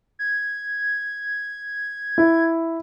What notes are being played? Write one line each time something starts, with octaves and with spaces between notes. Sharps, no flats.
G#6
E4